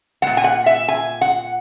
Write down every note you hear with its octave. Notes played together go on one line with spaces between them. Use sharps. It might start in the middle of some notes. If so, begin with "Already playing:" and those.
A#2 G#3 F#5
G#5
F#5
E5
G#5
F#5